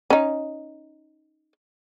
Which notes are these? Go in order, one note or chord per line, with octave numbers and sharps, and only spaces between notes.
C#4 D#4